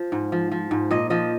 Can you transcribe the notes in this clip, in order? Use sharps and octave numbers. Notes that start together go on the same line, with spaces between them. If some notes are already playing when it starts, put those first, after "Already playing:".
Already playing: F3
G#2
F3
F3
G#2
A#2 D#5
F3 D#5